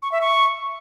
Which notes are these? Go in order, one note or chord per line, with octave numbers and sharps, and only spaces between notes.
C#6
E5
C#6